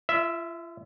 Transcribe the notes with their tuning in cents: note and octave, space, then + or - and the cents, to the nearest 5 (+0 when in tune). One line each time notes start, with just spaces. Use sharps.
F4 -40 E5 +0